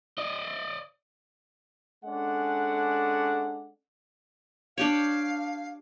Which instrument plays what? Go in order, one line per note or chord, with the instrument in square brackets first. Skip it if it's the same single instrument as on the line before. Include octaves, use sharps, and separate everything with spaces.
[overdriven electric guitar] D5 D#5
[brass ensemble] G#3 C#4 D4 A4 F#5
[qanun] D4 G4 C#5 [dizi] F5